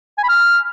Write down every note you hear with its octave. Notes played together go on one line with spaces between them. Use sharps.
G#5
B5
F6